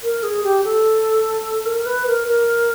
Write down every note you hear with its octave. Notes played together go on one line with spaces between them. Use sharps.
A#4
G#4
G4
A4
A#4
B4
A#4
A#4